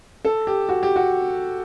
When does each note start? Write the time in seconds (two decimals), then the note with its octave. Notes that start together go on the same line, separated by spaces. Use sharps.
0.25 A4
0.47 G4
0.69 F#4
0.83 G4
0.96 F#4